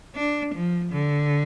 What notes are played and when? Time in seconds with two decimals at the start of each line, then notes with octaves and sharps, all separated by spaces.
0.15 D4
0.54 F3
0.92 D3